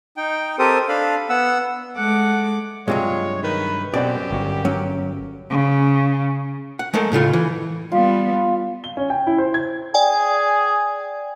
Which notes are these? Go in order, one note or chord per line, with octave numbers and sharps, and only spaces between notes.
D#4 G5
C4 G4 A4 A#4 C5 D#6
D4 A4 F5 B5
B3 F#5 E6
G#3 A3 F#5 D6
G2 C3 F#3 G#3 F4 C#5
D#3 B4
F#2 B2 C4 G4 D5 F#5
G1 F#4
F#3 C#4
C#3
F#5
G#3 A3 A4 A#4
A2 C#3 A3 F4
E3
G3 B3 F4
G7
C#4
G5
E4
C5
G#6
G#4 D5 G5 G#5